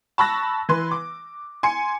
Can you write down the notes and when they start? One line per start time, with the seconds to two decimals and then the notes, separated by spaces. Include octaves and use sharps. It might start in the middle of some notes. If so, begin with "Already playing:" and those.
0.18 A5 B5 C#6 E6 F#6 A#6
0.69 E3 B4 C6
0.91 D6
1.63 G#5 C6 C#7